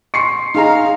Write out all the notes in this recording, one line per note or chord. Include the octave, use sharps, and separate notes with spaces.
C6 C#6 C7 C#7
D#4 G#4 F5 A#5